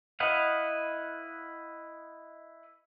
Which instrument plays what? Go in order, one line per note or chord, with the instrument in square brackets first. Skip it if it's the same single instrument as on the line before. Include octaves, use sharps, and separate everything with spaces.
[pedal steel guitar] E4 B4 D#5 F5 F#5